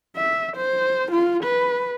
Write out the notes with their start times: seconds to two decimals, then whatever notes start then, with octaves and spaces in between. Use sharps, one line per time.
0.16 E5
0.56 C5
1.12 F4
1.44 B4